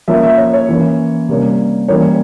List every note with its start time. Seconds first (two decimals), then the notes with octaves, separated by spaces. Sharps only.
0.08 F3 A#3 C#4 E5
0.23 E5
0.37 C#5
0.54 C#5
0.69 E3 A#3 C#4
1.28 C3 G3 A#3 C#4
1.88 E3 G3 A#3 C#4 C#5